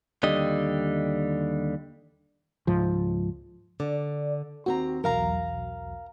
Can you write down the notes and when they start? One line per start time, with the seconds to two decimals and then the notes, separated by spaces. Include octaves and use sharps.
0.23 D#2 D3 G3 D#5
2.67 C#2 G#2 F3
3.80 D3 D5
4.66 D#2 C4 F#4 A#5
5.04 B1 E2 F#3 A#4 F5 A#5